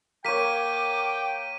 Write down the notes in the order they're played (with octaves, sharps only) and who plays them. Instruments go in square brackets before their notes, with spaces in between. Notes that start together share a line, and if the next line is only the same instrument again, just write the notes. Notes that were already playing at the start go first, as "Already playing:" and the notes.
[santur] A#3 C#5 [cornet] G5 [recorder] D6 [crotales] B6 D#7